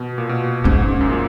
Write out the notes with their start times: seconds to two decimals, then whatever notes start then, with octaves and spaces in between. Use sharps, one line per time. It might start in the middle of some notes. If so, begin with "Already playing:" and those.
Already playing: B2
0.18 A#2
0.29 B2
0.64 G#2 C#4
0.82 G#2
1.01 F#2
1.10 A#2